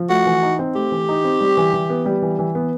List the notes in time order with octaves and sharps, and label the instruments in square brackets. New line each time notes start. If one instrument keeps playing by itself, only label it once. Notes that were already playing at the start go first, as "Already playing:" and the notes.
Already playing: [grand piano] F3
[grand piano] A3 [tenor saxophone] F#4
[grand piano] E3
D#4
C4
[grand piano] A3 [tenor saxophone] G4
[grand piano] E3
D#4
C4
G3
E3
E3
B3
G3
E3
E3
B3